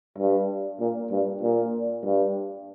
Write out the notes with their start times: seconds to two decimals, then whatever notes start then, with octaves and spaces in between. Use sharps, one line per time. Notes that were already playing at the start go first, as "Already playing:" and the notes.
0.18 G2
0.80 A#2
1.12 G2
1.43 A#2
2.05 G2